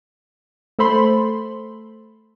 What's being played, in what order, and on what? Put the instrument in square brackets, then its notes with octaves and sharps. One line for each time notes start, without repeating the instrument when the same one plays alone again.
[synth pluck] A3 A4 C5 B5 C6